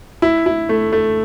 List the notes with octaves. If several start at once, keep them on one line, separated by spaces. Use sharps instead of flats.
E4
E4
A3
A3